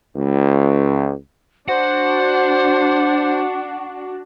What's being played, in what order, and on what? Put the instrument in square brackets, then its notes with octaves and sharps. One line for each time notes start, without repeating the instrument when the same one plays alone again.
[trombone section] C#2
[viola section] D4 [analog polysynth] F#4 [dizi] C5 [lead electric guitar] F#5